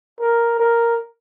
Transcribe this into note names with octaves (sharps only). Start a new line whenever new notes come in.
A#4
A#4